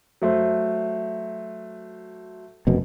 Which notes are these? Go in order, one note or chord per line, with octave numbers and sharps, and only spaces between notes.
F#3 A3 C5
F1 F#2 B2